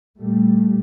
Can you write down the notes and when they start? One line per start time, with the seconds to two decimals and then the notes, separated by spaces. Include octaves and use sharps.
0.17 A#2 G3 A3